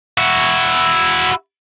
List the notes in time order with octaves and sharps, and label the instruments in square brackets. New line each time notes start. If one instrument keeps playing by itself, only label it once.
[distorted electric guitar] E4 F#4